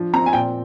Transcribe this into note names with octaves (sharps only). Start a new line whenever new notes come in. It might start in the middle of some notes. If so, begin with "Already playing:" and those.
Already playing: F3 D4
C4 A#5
G#5
A#2 G5